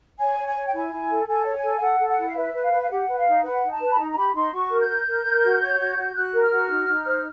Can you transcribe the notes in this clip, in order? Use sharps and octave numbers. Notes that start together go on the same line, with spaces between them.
C#5 G#5
C#5
G#5
C#5
G5
E4 G#5
E4
A4
A4 G#5
C#5
G#5
A4
F5
A4 F#5
A4
F#5
E4
F5
B4 E5
B4
F5
B4
F5
G4 F#5
B4
F5
D#4
B4 F#5
D#4
A5
B4
B5
D#4 A#5
A#5
G4 B5
D#4 C6
F#4 C#6
A#4
G6
A#4
A#4
A#4
F#4
C#5
F#4
F#4
F#4 F#6
A#4
F6
F#4
D#4
D#4
C5